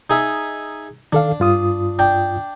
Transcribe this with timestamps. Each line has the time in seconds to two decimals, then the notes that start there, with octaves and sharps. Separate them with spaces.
0.10 D#4 G#4 E5
1.13 D#3 D4 A4 F5
1.40 G2 F4 D#6
1.99 D4 G5